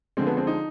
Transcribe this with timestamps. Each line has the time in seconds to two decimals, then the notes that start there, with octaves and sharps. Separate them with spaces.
0.17 D3 F3 G#3 C4
0.27 B3
0.37 C4
0.47 D#4